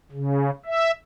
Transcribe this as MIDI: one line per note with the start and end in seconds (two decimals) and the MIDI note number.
0.12 0.50 49
0.66 0.91 76